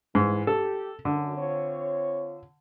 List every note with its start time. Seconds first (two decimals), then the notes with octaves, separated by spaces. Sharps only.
0.15 G#2 E3
0.47 G4 A4
1.05 F#2 D3
1.38 C4 F4 C#5